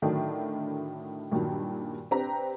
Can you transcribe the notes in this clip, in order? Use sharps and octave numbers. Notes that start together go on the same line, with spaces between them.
A2 D3 D#3 F#3 D4 D#4
G2 A#2 D#3 F#3
C4 D4 G4 B4 A#5